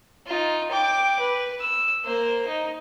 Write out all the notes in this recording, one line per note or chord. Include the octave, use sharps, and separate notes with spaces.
D#4 F4
G5 D6
B4
E6
A#3 C5
D#4